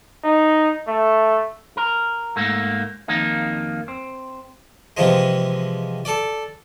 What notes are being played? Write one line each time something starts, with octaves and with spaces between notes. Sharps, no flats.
D#4
A3
A#4
G#2 A3 A#3
F2 D#3 A#3 D#4
C4
C3 E3 F3 G#3
A4 D5